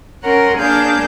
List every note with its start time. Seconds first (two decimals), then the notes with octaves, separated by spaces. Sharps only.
0.24 C#4 A#4 F#5 C6
0.59 A#3 D4 G#4 F5 A5 G6